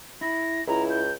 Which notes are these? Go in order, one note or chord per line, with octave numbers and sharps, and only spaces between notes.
E4 A#6
C#2 E4 A#5
G6